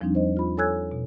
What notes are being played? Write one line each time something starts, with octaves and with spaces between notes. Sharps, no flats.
E2 F3 G3 C4 D4 D#4
C5 D#5
F4 B5
A4 C#5 G#5 E6 F#6 G#6
B2